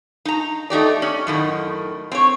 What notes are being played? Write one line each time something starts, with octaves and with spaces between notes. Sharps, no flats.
D#4 A#5
A3 D#4 G4 D5
C#4
F#2 A2 D#3
C4 C#5